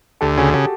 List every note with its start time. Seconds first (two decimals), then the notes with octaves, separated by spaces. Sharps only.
0.21 D2 G4 A4
0.37 C#3 F#4 G#4
0.54 C#3 G4 A4